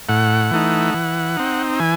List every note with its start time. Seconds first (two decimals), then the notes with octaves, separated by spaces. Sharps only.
0.09 A2 F#5
0.51 E3 A3 D#4
0.94 E3
1.37 C4 D#4
1.80 E3 G#5